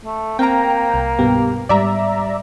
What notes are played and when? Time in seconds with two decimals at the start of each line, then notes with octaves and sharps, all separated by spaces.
0.05 A3
0.39 A#3 C4 F5 G5 A#5
0.94 C2
1.19 G2 B2 B3 G4
1.69 G#2 G3 D5 E5 A#5